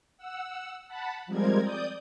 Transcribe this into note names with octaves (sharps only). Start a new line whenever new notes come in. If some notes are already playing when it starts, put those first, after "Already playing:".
F#5 E6
F#5 A5 B5
F3 G3 G#3 C4 A#4 G#6
D5 D#6 G6